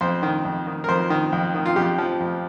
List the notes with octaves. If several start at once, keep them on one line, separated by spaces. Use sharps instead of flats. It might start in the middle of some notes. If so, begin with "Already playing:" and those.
F2 C5
D#3
F2
D#3
A#4
F2 C5
D#3
F2
D#3
F4
F2 G4
F3
F2